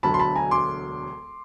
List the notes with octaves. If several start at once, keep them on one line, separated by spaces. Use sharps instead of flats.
E1 D2 D3 F#3 A5 B5
C6
A5 B5
G#5 A#5
C6 D6